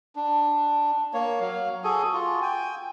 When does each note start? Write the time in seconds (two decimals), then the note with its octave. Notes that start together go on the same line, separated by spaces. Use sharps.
0.16 D4
1.14 A#3 C#5
1.40 F#3 F5
1.84 F#4 G#4 A4 G#5
2.14 F4 F#4
2.42 G5 G#5